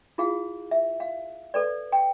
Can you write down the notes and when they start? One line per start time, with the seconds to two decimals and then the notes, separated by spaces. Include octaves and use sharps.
0.18 E4 F4 G#4 F5
0.71 E5
1.00 F5
1.54 A4 B4 D5
1.92 G5